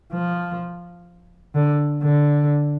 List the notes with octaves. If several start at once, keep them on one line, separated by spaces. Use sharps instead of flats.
F3
D3
D3